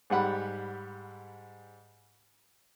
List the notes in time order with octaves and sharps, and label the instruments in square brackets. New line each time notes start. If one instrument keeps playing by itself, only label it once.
[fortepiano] G#2 G3 F#5 B5